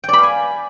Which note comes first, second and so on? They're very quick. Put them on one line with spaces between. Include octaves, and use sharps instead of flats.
G5 D5 B5 F5 G#5